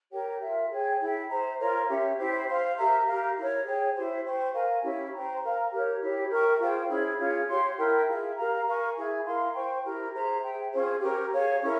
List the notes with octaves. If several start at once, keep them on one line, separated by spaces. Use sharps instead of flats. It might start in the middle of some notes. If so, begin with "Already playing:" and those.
G4 A#4 C#5 G5
F4 A#4 E5
G#4 C#5 G5
E4 G#4 E5 G5
C5 E5 A#5
F4 A#4 C#5
C#4 G4 C#5 E5
E4 G4 C5 G5
C5 F5 C6
G4 A#4 E5 A#5
G4 A#4 F5
E4 A#4 C#5
G#4 C#5 G5
E4 G4 C5
C5 G5 C#6
A#4 F5 G#5
C#4 E4 G4 C#5
C5 G5 A#5
A#4 F5 A#5
G4 A#4 C#5
E4 G4 C#5
A#4 E5 G5 C#6
F4 G#4 C5 G5
C#4 E4 G#4
C#4 F4 G#4
G4 C#5 F5 C6
E4 A#4 E5 G5
F4 G#4 E5
G4 A#4 F5 A#5
A#4 F5 G#5 C#6
E4 G#4 E5 G#5
E4 A#4 F5 C6
C5 G5 C#6
E4 G4 A#4
G#4 C5 E5 A#5
G#4 E5 G5
C#4 F4 G#4 C5
C#4 G4 A#4
G#4 C#5 F5
C#4 E4 A#4